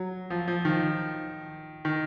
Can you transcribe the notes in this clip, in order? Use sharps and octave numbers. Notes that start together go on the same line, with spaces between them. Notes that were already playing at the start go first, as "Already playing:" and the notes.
Already playing: F#3
F3
F3
D#3
D#3